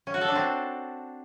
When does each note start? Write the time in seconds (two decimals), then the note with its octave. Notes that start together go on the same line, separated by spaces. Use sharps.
0.07 C#4
0.14 F#4
0.21 A4
0.28 D4
0.36 C4